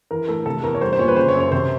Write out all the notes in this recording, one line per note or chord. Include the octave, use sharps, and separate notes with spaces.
E3 A#4
A2 A4
C3 A4
E2 A#4
C#5
G3 C5
C5
A#2 C#5
B4
C#3 C5
C#5
F#2
C#5
C3 C5